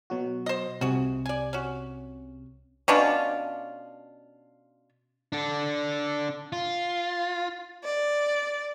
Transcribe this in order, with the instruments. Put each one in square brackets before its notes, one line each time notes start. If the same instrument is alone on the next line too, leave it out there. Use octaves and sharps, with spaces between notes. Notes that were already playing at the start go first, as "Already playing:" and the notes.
[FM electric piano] B2 F#3 F#4
[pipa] C5 D#5
[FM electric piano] C2 C3 [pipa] F#4 G#4
[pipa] D5 G#5
C#4 F#4
B2 C#4 D4 F4
[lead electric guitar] D4 A4
F4
[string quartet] D5